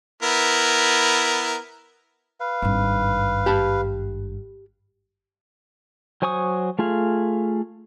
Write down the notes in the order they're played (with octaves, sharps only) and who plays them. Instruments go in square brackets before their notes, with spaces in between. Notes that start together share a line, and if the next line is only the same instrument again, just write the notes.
[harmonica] B3 E4 A#4
[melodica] B4 F5
[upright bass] G#1 G2
[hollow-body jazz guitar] G4 A5 B5
[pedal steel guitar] F#3 C5 G#5 C#6 D#6
A3 F4 G#4 F5